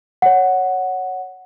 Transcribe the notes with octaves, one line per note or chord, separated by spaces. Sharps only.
C#5 F#5